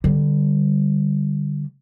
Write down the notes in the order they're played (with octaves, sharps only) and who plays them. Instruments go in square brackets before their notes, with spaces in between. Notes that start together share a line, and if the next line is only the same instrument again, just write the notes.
[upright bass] D3 G3